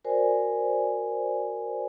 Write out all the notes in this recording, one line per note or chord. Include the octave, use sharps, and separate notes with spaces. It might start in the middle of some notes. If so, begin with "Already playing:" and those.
F#4 A#4 C5 D5 G#5